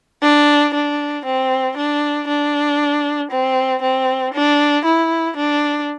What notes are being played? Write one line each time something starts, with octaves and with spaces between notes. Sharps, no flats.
D4
D4
C4
D4
D4
C4
C4
D4
E4
D4